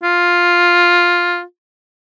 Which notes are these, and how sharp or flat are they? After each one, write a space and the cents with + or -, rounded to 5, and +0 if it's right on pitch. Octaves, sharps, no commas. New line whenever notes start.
F4 +5